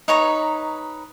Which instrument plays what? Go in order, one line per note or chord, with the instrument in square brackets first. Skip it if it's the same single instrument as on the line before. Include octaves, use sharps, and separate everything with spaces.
[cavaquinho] D#4 B4 C#5 A#5